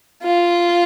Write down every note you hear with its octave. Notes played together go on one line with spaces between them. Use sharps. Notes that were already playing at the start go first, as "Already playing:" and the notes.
F4